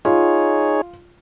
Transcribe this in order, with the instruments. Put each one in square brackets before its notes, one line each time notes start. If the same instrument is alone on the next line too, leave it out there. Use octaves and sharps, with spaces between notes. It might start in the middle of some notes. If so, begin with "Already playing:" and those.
[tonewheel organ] D#4 G#4 C#5 [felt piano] F4